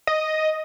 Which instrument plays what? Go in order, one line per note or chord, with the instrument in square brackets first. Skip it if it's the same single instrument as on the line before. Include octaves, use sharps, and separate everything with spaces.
[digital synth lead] D#5